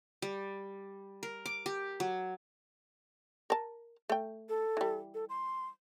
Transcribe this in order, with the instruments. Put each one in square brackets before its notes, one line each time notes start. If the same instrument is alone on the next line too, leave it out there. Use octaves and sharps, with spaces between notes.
[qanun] G3
A#4
D6
G4
F#3
[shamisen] A#4 A5
A3 G5
[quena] A4
[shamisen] E3 G3
[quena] A4
C6